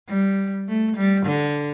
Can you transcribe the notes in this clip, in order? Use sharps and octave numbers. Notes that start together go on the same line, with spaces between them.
G3
A3
G3
D3